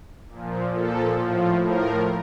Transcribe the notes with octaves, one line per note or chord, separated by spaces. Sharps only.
A#2 F3
A#2 F3 A4
A2 F3
A2 F3 A#4